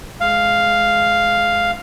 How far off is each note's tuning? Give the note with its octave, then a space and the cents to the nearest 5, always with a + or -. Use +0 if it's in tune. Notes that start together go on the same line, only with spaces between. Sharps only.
G#3 +20 F5 +0